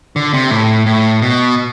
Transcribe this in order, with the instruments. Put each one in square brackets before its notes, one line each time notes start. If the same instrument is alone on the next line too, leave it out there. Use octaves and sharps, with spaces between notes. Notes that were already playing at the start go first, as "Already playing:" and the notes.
[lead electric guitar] D3
C3
A2
A2
B2